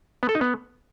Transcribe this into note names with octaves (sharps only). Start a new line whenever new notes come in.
B3
A4
D#4
B3